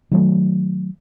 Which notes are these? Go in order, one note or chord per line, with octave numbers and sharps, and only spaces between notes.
D#3 F#3 A3